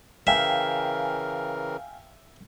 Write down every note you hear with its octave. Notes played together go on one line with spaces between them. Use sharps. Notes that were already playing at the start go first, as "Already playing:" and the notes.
C#3 E3 A#4 E5 F5 G5 G#5